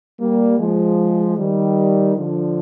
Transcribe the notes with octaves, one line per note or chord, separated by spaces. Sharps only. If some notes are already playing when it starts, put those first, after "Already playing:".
G3 A#3
F3 G#3
D#3 G3
D3 F3